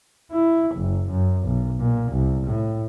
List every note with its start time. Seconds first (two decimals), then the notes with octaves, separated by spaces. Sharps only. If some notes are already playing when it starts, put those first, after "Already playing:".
0.32 E4
0.76 F#1
1.10 F#2
1.47 B1
1.80 A#2
2.12 C2
2.47 A2